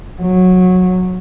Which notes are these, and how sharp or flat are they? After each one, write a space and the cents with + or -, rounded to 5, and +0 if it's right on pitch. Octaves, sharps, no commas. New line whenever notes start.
F#3 -15